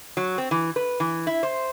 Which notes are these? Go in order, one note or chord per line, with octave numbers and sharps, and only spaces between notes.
F#3
C4
E3
B4
E3
E4
C5